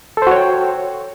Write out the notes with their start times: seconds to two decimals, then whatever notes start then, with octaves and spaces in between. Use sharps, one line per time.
0.17 A4
0.22 C5
0.27 F#4
0.32 C#5
0.36 G5